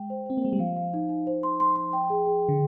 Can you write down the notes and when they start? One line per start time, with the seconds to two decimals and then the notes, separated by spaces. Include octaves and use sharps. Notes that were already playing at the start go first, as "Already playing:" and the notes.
Already playing: G#3 G5
0.10 C5
0.26 C4 C5
0.37 A#3
0.42 G#3 C5
0.53 G3
0.59 F3 F5
0.76 F5
0.94 D#4
1.09 D#4
1.27 C5
1.43 C6
1.60 C6
1.76 C6
1.93 G5
2.10 G#4
2.26 G#4
2.43 G#4
2.49 D3